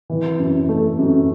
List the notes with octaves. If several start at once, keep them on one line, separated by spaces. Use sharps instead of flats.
E3
F#2
A3
F#2